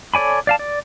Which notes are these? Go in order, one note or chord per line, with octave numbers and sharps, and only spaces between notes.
A4 C#5 D5 G#5 B5
D5 F5 A5
D5